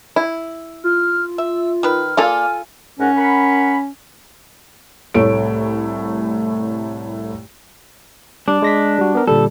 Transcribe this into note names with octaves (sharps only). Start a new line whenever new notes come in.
E4
F4 F6
E5 E6
D#3 B4 F6
A#3 F4 A4 D5 F5 G#5
G#2 C#4 A#4 F#5
A#4 F#5 B5
C2 A2 A3 C#5 D7
G3 D4
G#3 A#6 B6
G3 F#4
B3 A#4
A#2 D3 G3 A4